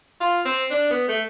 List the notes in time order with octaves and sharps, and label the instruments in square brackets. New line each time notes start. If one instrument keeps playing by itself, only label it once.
[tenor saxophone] F4
C4
D4
B3
A3